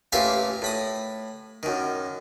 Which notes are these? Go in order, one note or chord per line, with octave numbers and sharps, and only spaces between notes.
A1 A#2 G4 E5 F5 G#5
A2 B5 D#6
F#2 D#3